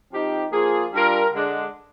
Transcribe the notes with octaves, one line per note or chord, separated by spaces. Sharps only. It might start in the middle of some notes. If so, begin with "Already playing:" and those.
F3 C4 D#4 G4
F3 A#3 F4 G#4
G3 D4 F4 A#4
D3 G#3 D4